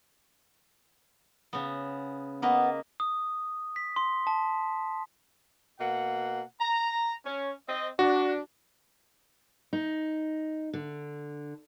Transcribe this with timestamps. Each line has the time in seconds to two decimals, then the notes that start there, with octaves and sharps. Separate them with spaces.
1.53 C#3 B3
2.42 A#3 B3 B4 D#5
3.00 D#6
3.76 B6
3.96 C6
4.27 A5
5.80 B2 A#3 F#5
6.60 A#5
7.25 C#4
7.68 C4 D#5
7.99 D4 F#4
9.73 D#4
10.73 D3